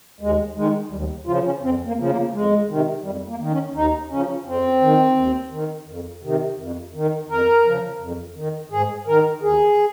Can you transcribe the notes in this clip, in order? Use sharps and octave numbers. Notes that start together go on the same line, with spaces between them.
D#2 G#3
D#3 G#3
D#2 G3
C#3 F3 F4
C#4
F2 C4
A#3
C#3 F3
A#3
F2 G#3
C3 D#3
F2 G3
A#3
D#3
C#4
D#2 D#4
C#3 F3 C#4
F2 C4
D#3
D#2
D#3
F2
C3 D#3
F2
D#3
F2 A#4
C#3 F3
F2
D#3
G#2 G#4
D#3 A#4
D#2 G#4